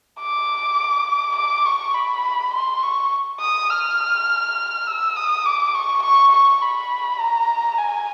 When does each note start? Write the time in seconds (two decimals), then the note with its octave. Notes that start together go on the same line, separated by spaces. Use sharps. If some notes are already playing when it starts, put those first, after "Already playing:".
0.20 D6
1.36 D6
1.66 C#6
1.94 B5
2.54 C6
2.83 C#6
3.41 D#6
3.70 F6
4.87 E6
5.16 D#6
5.46 D6
5.75 C#6
6.03 C#6
6.32 C#6
6.62 B5
7.20 A#5
7.78 G#5